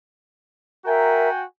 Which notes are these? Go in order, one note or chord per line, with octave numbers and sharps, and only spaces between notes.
F#4 A#4 E5 G5 G#5 A#5